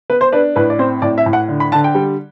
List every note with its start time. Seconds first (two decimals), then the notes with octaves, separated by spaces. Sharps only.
0.10 B3 B4
0.21 C5
0.33 D4 B4
0.56 A2 B4
0.70 D5
0.79 C4 C5
1.02 A2 D5
1.18 E5
1.26 A2
1.33 F#5
1.49 D3
1.60 B5
1.72 D3 A5
1.84 G5
1.95 G3